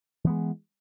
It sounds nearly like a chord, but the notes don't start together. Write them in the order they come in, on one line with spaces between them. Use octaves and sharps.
E3 B3 G#3